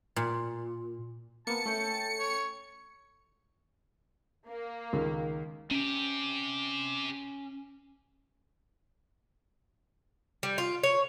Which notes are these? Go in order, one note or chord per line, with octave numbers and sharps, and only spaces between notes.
A#2
A#3 B3 A5 C#7
A3 C#4 G5
C#5
A#3
C#2 D#3
C3 C#4 G4
G3
F4
C#5